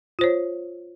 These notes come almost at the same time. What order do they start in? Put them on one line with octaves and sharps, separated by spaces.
F4 C5 C#5